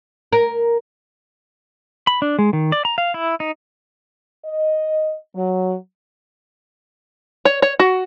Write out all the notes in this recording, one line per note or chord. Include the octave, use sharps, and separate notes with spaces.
A#4
B5
D4
G#3
D#3
D5
A#5
F5
E4
D#4
D#5
F#3
C#5
C#5
F#4